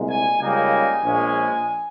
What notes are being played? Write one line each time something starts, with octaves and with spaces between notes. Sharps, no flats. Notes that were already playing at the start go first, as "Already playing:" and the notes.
Already playing: C2 A#2 G#3
G#5
C#2 C#3 G3 A#3 D#4 G#5
A#1 A#2 F3 G#3 C#4